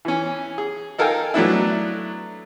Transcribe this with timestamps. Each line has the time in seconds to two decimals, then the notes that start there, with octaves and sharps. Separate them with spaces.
0.05 E3 C#4
0.58 G#4
0.98 D#4 A4 A#4 F5 G5 G#5
1.34 F#3 A3 B3 D4 E4